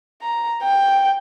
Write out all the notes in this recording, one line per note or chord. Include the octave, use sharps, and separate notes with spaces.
A#5
G5